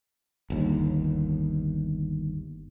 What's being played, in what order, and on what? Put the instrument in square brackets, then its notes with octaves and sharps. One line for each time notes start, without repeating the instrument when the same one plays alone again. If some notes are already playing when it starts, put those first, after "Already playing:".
[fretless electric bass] G1 D#2